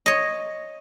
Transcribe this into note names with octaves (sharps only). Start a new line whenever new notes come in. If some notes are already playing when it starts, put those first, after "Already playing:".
C#5 D#5